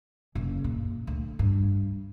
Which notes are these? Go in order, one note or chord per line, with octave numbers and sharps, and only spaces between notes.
F#1 C#3
A#2
D2
G2